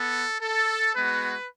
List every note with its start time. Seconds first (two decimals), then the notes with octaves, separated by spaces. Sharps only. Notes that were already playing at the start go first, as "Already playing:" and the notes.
Already playing: B3 A4
0.41 A4
0.95 G#3 B3 F#4 B4